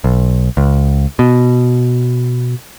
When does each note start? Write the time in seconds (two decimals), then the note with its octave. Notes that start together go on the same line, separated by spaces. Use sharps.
0.04 B1
0.57 C#2
1.19 B2